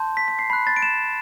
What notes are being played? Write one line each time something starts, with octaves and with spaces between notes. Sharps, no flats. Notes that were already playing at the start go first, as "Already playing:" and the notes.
Already playing: A5 C6 G6
B6
B6
C7
B5 F#6 C7
A6
D7
E7